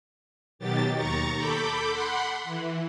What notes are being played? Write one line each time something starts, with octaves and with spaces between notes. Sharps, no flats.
B2 D#3 F#3 G4 A6
D#2 A#5 C#6 A6
A4 B5 D6 G6
F#5 B5 C6
E3